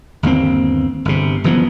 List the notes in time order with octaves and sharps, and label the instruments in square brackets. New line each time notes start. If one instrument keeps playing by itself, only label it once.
[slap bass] G1 D#2 A#3 C4
G1 C3
F#1 E3 F3 B3